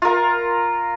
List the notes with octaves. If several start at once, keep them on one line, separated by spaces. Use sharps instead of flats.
F4 A#4